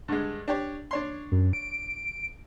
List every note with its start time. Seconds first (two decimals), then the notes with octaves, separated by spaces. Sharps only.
0.08 G2 D3 G#3
0.48 D4 G4 C#5
0.91 D4 C#5 C6
1.32 F#2
1.53 D7